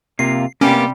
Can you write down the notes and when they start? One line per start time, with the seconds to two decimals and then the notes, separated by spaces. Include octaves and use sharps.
0.19 C3 A#3 F4 C7
0.61 C3 G3 A#3 B3 C#4 G4 D6